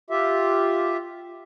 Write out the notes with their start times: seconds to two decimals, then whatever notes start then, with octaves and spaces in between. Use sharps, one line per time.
0.10 F4 G4 E5